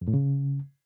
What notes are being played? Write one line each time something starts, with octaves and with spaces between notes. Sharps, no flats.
F2
A2
C#3